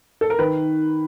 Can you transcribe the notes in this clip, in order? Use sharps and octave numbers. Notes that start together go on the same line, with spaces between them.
A4
A#4
D#3 B4